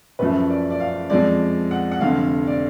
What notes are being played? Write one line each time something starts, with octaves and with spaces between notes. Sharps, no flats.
F#1 F#2 C#3 F3 A3 B4
D5
D5
F5
F2 F3 G#3 D5
F#5
F#5
F1 F2 D3 F5
D5